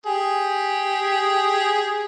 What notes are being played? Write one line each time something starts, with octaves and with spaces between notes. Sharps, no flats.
G4 G#4